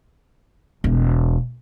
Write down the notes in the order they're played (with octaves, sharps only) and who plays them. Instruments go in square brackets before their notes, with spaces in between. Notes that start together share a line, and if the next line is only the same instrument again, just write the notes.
[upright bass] E1